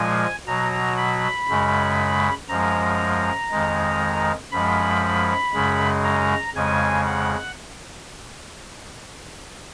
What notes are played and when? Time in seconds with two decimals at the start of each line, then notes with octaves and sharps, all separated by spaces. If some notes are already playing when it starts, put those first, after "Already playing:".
Already playing: A#2 F3 G#3 G#5
0.46 B2 F#3 A#5
0.97 B5
1.48 F#2 C#3 G#3
2.49 F#2 F3 G#3 A#5
3.51 F2 D#3 G#3
4.51 F#2 F3 G#3 B5
5.53 F#2 C#3 G#3
6.04 A#5
6.55 F2 C#3 G#3 G#5
7.06 F#5